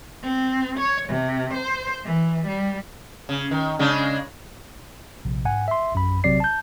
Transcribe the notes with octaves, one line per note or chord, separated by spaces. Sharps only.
C4
C#5
C3
C5
E3
G3
C#3
D#3
C#3 G#3 D4
A#1 C3
G#2 F#5 G#5
E5 C6
A#1 F#2 B5
A#1 C3 F#3 C4 D5 C7
A5 G6